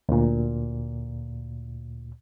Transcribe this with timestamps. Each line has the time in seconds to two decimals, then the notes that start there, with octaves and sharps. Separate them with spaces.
0.09 D2 A#2